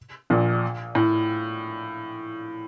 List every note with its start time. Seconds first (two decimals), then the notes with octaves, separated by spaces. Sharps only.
0.30 A#1 A#2
0.95 A2